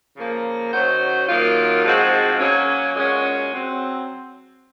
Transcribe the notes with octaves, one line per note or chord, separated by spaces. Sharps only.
C#3 F3 A#3
D#3 F#3 C#4 F#4 C5
F#2 D#3 A#3 F4
G#2 F3 G#3 C4 F#4
F#3 A#3 C#4
A#2 G#3 C#4 F#4
F#3 C4